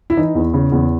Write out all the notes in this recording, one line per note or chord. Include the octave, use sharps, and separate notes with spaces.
E4
E3 D#4
E2
C#3
E2